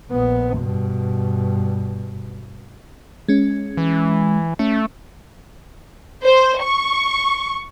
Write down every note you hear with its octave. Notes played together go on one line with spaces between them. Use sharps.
A#1 B3
G2 B2
G#3 C#4
E3
A3 C#4
C5
C#6